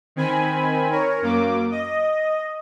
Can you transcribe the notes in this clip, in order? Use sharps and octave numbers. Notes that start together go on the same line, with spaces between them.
D#3 C4 G#5 B5
A#4 C#5
F#2 A#3 D6
D#5